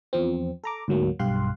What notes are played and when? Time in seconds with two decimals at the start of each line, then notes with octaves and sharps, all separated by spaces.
0.13 E2 F3 C4
0.64 A4 A#5 D6
0.88 D2 G#2 F#3 A#3
1.19 B1 G2 G4 F5 C6 F#6